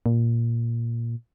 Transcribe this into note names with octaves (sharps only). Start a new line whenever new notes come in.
A#2